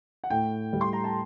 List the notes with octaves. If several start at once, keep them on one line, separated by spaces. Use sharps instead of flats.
F#5
A2 G5
G3
C6
A#5
A5